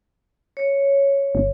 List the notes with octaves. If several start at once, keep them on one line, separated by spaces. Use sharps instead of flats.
C#5
G1